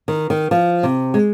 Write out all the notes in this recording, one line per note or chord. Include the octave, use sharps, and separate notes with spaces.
D#3
D#3
F3
C3
G#3